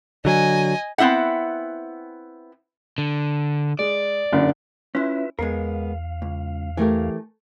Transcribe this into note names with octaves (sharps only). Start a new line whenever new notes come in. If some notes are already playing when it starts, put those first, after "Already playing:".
D3 F#3 D#5 G#5
B3 C4 E4 E5 F#5
D3
G#3 D5
F#1 F#2 D3
C#4 E4 F4 B4 E5
E2 G#3 B3 A#4 F5
C#2
E3 A3 G4 A#4 G#5